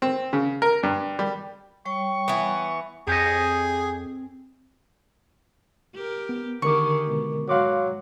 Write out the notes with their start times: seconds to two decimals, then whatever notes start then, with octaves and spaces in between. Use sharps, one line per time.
0.02 C4
0.33 C#3
0.62 A#4
0.83 G2
1.19 G3
1.85 G3 C#5 G5 C#6
2.28 E3 B3
3.07 F2 C4 G4 G#4 C#5 D#5
5.94 G4 A#4
6.29 B3
6.62 D3 D#3 G4 G#4 A#4 C#6 D6
7.06 B2 G#3
7.49 G#2 F#3 F5 C6 D6